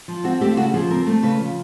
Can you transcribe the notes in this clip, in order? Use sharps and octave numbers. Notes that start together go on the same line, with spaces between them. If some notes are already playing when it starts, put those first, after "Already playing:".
F3
C4 F#4
A3 G4
F4
C#3 F#4
F3 G#4
C4 A#4
A3
C#3 B4
F3